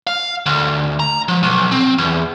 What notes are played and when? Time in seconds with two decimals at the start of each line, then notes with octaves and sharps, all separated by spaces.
0.07 F5
0.46 D2
1.00 A#5
1.28 F3
1.43 B1
1.72 C4
1.98 E2